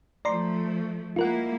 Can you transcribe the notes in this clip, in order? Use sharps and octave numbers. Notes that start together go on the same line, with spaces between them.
F3 A3 D5 A#5 C6
G#3 A#3 E4 F4 A#4 F#5